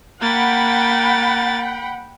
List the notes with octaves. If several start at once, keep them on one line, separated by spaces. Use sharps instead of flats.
A#3 F#5 G5 B5 A6